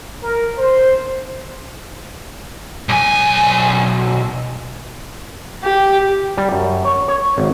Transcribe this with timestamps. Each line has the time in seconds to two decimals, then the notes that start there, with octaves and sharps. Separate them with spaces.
0.24 A#4
0.59 C5
2.89 B1 G#5
5.64 G4
6.38 G3
6.52 F#2
6.85 C#5
7.08 C#5
7.38 G#1